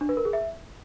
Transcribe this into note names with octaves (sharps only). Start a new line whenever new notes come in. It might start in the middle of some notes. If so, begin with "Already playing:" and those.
D4
B4
A#4
G#4
E5